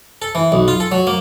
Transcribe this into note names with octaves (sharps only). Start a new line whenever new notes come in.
A4
E3
B1
F4
A4
F#3
A#3